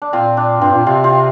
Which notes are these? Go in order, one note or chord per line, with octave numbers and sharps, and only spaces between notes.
D4
A#2 C4 F4
D4
G2 C4
A#2
C3 C4 F4
C4 F4